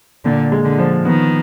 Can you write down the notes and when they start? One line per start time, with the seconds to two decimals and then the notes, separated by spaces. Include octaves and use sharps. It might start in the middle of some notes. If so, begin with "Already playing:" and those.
0.25 A#2 D3
0.52 G#3
0.65 D3
0.78 F3
1.05 D#3 B3